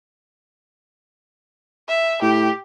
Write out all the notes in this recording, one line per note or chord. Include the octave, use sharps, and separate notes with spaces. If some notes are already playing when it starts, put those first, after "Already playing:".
E5
A2 G4